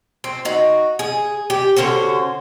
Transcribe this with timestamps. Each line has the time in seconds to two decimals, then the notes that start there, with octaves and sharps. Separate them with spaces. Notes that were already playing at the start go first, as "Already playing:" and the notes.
0.24 C4
0.45 D#4 F#4
0.99 G#4
1.50 G4
1.76 D3 C#4 F#4 C5